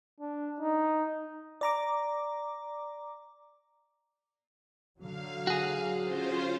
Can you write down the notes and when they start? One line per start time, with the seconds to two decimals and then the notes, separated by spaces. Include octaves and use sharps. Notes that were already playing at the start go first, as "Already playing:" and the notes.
0.20 D4
0.61 D#4
1.61 D5 A#5 D6
5.00 D3 F#3 F5
5.47 F#4 G#4
6.00 C#4 F4 C5